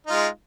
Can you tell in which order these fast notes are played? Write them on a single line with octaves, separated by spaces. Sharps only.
D#4 F4 G#3